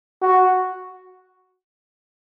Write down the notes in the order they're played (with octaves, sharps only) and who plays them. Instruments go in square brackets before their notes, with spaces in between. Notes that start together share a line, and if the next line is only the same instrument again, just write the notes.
[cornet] F#4